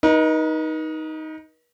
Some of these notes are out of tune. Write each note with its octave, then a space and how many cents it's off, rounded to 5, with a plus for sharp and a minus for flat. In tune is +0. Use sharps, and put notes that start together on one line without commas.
D#4 +10 B4 -45